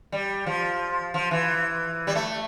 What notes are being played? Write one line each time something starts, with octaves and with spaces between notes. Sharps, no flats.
G3
F3
F3
E3
G3
A3